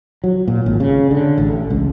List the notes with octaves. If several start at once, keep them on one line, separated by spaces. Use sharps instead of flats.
F#3
A#2
G#1
C#3
D3
A1
C#2